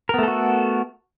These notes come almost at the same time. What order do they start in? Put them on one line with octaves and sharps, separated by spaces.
A#4 B3 A3 A4 F#4